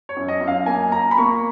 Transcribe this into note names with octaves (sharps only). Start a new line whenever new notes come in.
C#5
F#2
D#5
F#2
F5
A#3 G#5
A#3 A#5
B5
A#3 C#6